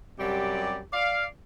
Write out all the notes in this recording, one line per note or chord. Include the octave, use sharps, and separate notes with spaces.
F#2 C3 G3 G4 D5
D5 F5